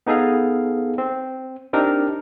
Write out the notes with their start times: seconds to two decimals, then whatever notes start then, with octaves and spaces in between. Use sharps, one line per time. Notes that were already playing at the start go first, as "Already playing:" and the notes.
0.07 B3 D#4 G#4 A4 F5
0.98 C4
1.73 C4 D4 D#4 G4 A#4